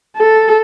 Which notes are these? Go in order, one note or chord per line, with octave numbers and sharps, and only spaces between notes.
A4